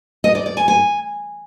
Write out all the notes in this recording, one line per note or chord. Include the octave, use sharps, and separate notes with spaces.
D#5
D5
D5
G#5
G#5